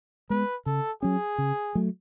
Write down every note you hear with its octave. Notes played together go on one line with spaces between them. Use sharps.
G#3 B3 B4
C#3 A4
F#3 C#4 G#4
C#3
F#3 A3